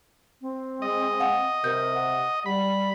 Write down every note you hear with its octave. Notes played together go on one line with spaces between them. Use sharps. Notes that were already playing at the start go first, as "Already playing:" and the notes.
C4
G#3 D#5
F5 F#5 G#5
C3 A#4 G6
F#5
G3 B5